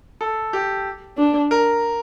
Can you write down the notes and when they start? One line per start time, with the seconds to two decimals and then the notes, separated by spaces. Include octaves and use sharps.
0.21 A4
0.53 G4
1.18 D4
1.51 A#4